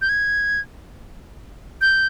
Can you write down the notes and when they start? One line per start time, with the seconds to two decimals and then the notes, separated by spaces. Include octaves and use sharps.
0.01 G6
0.09 G#6
1.81 G6